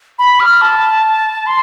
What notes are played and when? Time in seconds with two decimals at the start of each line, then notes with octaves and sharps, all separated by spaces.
0.19 B5
0.40 F6
0.62 A5
1.46 C6